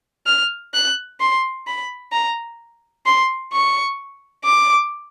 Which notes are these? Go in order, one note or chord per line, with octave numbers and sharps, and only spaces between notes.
F6
F#6
C6
B5
A#5
C6
C#6
D6